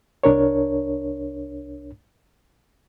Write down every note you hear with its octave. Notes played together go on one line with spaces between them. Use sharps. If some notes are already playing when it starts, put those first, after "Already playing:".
C2 D4 A#4 C#5